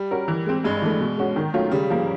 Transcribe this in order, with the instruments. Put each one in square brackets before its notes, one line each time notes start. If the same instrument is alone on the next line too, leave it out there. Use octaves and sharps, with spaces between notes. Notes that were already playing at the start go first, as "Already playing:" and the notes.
Already playing: [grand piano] G3
[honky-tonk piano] C#4 F#4 A#4
E3
G#3 C4
[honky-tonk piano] G2 [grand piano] G#3
[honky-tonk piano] E3 A3
B2
G#3 C#4 F#4
D#3
F#3 A3 C#4 F4
[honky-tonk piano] C#3 [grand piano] G3
[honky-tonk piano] F3 A#3